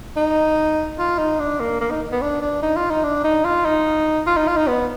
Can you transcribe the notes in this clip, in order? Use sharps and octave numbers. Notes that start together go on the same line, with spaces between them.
D#4
F4
D#4
D4
A#3
A#3
D#4
B3
D4
D4
D#4
F4
D#4
D4
D#4
F4
D#4
F4
D#4
F4
D#4
B3